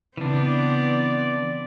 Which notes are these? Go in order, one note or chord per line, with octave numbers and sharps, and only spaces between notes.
C#3 E3 B3 C4 D4 D5